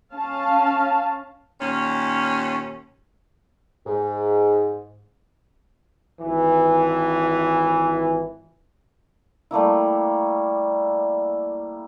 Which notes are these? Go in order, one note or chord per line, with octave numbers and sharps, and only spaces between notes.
C#4 F5 A5
D#2 A#2 C#4
G#2
G#1 E3
G3 A3 A#3 E4